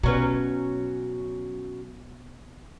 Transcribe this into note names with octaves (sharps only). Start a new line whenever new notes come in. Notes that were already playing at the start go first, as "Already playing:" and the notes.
B2 F#3 C#4 B4